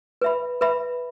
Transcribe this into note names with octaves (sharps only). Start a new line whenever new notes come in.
B4 E5 B5
B4 E5 B5